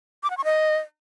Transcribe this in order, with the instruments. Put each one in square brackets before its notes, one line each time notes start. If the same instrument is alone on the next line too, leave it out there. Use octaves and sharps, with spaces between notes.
[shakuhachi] D6
F#5
C#6
D#5